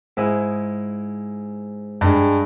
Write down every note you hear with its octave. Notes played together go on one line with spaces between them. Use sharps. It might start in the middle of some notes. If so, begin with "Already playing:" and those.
G#2 E4 D#6
G2 G#3